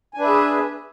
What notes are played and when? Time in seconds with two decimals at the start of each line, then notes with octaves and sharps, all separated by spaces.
0.14 G#5
0.17 D4
0.21 B4
0.24 E5
0.27 G#4